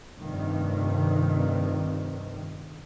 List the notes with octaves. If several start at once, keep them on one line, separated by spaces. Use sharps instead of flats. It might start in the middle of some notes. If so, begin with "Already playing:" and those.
F1 G2 C3 D#3